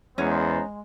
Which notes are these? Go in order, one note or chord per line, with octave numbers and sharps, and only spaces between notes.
E2 G#3 B3 C#4 C5 A#5